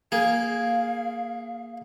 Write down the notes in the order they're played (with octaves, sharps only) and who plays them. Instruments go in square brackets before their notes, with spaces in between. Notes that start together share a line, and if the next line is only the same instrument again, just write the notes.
[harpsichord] A#3 G#4 [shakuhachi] F5